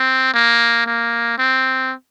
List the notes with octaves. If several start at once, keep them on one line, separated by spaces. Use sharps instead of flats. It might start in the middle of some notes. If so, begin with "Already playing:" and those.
Already playing: C4
A#3
A#3
C4